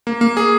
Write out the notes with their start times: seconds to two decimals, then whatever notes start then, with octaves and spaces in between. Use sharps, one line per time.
0.07 A#3
0.21 A#3
0.37 G#4